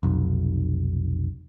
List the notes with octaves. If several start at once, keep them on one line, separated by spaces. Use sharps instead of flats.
F1 B1